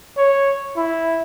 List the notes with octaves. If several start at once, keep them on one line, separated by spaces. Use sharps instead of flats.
C#5
E4